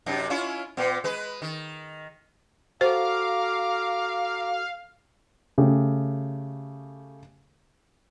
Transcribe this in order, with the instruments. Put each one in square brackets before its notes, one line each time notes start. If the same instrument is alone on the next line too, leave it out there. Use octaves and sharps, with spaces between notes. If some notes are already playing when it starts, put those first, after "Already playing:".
[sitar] F#2 C3 D#4
C#4 E4 F4
A#2 B3
G#3 B4
D#3
[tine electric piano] F#4 A4 [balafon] C5 [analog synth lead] F5 [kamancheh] A#5 D6
[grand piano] C#3 A3 G4